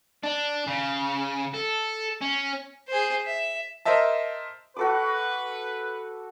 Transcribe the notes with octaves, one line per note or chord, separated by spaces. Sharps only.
D4
C#3
A4
C#4
G#4 C5
E5
A#4 C5 D#5 E5 A5
F#4 A4 B4 D6